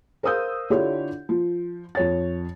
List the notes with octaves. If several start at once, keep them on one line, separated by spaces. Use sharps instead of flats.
A#4 C5 F5 D#6 E6 G6
D3 E4 F4 G4 A4 C#5
F3
F2 C#5 A6